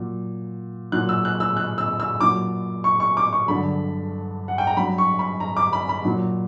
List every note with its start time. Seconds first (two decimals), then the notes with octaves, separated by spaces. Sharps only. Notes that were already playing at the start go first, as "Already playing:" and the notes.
Already playing: A#2 F#3
0.92 A#2 F#3 F#6
1.09 E6
1.25 F#6
1.40 E6
1.57 F#6
1.78 E6
2.00 E6
2.21 A#2 F#3 D6
2.84 C#6
3.00 C#6
3.17 D6
3.33 C#6
3.48 G2 D3 F#3 B5
4.48 F#5
4.58 G5
4.67 A#5
4.77 G2 F#3 B5
4.98 C#6
5.19 B5
5.40 A#5
5.57 D6
5.73 B5
5.89 B5
6.05 A#2 F#3